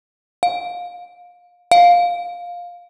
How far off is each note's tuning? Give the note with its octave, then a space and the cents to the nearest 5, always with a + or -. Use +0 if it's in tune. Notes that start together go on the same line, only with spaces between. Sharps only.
F5 +25
F5 +10